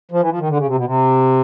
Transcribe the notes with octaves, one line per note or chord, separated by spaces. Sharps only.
F3
E3
F3
D#3
D3
C#3
C3
B2
C3